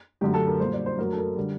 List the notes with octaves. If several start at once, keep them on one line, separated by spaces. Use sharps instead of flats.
F#2 D3 F#3 A3 G4
A4
A#4
A#2 G3 C5
D5
C5
F#2 F#3 A3 A#4
A4
A#4
D3 G3